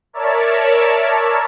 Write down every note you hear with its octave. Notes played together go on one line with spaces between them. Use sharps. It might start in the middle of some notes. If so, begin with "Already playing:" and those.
A#4 C#5 D5 E5 A5